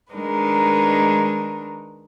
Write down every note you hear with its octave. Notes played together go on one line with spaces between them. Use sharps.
D#3 G#3 D4 D#4 A#4 B4